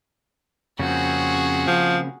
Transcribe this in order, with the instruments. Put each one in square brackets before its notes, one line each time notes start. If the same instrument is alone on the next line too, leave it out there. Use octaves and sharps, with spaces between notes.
[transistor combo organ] F2 C#4 [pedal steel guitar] C#3 A#3 C4 [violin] F#4 G#4
[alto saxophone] F3